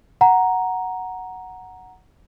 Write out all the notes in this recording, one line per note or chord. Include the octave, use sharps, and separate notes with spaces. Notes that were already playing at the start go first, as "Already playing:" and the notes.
F#5 A#5